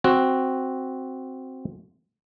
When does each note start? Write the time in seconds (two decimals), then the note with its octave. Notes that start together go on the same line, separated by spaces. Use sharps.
0.04 C4 F#4